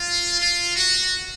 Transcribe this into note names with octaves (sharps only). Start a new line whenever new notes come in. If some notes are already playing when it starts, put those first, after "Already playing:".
Already playing: F4
F4
F#4